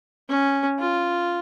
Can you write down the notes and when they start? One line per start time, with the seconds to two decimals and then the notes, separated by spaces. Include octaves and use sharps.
0.29 C#4
0.79 F4